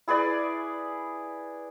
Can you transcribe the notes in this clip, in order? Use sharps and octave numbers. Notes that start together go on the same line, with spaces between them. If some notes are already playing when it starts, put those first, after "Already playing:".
E4 G#4 B4 D5